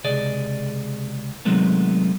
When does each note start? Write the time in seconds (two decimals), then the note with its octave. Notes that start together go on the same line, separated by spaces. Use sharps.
0.04 C#2 C3 G#4 D5 D#5
1.45 C3 D#3 F#3 G#3 A3 B3